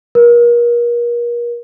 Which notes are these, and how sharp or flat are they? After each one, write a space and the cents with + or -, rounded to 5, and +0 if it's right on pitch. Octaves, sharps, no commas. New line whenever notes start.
A#4 +35